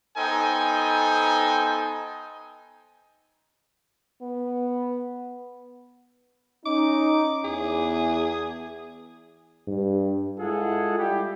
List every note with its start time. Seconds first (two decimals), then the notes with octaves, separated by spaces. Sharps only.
0.17 B3 D#4 A4 C5 G5 G#5
4.22 B3
6.66 C#4 D#4 D6
7.44 E2 G#4
9.68 G2
10.40 G#3 E4 F4 G#4 A4 F#5
10.98 G3 E4 G4